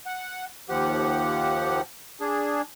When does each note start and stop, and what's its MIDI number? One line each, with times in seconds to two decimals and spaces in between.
0.06 0.45 78
0.69 1.81 39
0.69 1.81 53
0.69 1.81 67
0.69 1.81 78
2.20 2.62 62
2.20 2.62 68